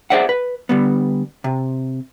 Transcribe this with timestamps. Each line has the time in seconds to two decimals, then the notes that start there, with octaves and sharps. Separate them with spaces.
0.10 G#4 A4 C5 D5 E5 F#5
0.29 B4
0.69 D3 G3 B3
1.44 C3